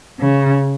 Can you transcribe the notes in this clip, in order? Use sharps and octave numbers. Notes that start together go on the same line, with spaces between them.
C#3